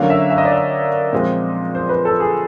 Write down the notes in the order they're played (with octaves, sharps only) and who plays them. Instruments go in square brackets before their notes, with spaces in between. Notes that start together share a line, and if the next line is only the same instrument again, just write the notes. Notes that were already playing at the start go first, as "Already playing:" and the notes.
Already playing: [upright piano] D3 F#3 A#3 C#4 F5
E5
E5
D#5
D5
D#5
A#2 F3 G#3 C4
C5
B4
A4
G#4